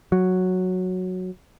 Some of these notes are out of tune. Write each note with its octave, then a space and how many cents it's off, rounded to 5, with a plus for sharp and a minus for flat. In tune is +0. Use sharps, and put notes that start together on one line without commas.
F#3 -5